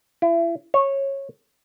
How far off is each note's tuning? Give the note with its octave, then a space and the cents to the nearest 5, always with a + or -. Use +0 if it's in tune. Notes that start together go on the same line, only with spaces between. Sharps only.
E4 +35
C#5 -15